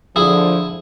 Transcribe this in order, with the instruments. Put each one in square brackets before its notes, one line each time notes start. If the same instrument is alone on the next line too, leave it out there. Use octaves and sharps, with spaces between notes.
[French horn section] D3 F3 [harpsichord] E4 G#4